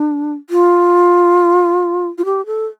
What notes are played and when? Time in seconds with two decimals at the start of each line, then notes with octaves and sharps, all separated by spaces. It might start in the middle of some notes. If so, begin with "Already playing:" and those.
Already playing: D4
0.50 F4
2.18 F4
2.25 G4
2.46 A4